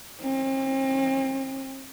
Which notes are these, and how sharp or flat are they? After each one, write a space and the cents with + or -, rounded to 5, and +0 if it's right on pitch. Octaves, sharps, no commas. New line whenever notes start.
C4 +40